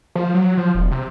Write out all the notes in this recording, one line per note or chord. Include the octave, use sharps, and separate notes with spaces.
F3
F#3
F3
E1
C3